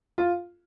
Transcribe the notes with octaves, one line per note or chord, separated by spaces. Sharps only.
F4